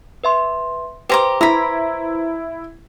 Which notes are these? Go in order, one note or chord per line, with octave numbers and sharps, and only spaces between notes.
B4 E5 C6
G4 B4 C5 A#5 C6 D6
E4 A#5 B5